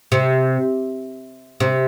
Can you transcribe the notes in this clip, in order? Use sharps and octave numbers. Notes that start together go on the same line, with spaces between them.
C3
C3